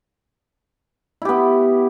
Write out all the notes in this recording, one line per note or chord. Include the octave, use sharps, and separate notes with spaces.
B3 E4 G4